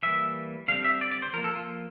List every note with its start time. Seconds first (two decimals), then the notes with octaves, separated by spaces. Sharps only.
0.03 E3 G3 A#3 E5
0.68 D3 G3 C4 F5
0.84 E5
1.01 D5
1.11 D5
1.22 C5
1.33 F3 A#4
1.38 A#3
1.44 A4
1.55 F4